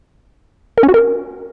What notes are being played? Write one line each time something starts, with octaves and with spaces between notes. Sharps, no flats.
A#4
C#4
F#4
A#4